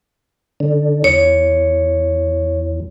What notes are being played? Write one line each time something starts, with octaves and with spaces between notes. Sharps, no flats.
D3
E2 C#5